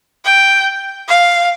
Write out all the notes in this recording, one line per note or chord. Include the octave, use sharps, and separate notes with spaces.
G5
F5